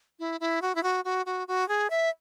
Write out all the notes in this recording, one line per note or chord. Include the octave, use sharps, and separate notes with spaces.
E4
E4
F#4
E4
F#4
F#4
F#4
F#4
G#4
E5